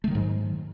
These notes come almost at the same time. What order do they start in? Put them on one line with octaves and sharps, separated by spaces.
A3 D#3 F#3 G#2